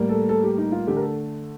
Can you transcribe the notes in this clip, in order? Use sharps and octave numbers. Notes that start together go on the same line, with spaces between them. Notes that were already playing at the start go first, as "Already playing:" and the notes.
Already playing: A2 G3 A#3
A4
A4
G4
D#4
F4
D3 A3 G4
A#4
A4